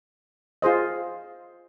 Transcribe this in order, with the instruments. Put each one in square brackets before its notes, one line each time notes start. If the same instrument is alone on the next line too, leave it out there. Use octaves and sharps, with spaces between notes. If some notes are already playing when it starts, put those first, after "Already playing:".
[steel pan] F4 G#4 C5 D#5